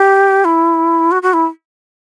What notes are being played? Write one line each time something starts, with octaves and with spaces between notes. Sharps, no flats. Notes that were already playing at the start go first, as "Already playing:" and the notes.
Already playing: G4
E4
F#4
F#4
E4